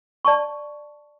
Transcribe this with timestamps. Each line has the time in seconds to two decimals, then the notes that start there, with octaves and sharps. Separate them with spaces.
0.25 D5 A5 C#6